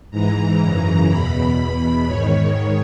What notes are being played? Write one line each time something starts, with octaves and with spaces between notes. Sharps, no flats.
G#2 E3 A#5
F#2 C#3 E3
E2 B2 B5
E2 B2
G#2 D#3 C#5